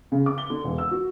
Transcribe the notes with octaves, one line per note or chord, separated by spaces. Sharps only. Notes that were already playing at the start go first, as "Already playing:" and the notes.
C#3
D6
G7
D3
E1
E6
F#4